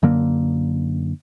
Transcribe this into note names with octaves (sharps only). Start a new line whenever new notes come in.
F#2 D3 A#3